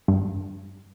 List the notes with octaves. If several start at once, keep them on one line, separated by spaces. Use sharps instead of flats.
G2